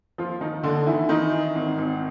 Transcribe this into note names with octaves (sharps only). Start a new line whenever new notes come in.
D#2 F3 F4
D#3 D#4
D#2 D3 D4
D#3 E3 E4
D#3 E3 D#4
E3
G#1
G#1